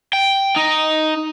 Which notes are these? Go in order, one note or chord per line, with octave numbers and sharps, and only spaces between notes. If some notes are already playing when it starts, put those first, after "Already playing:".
G5
D#4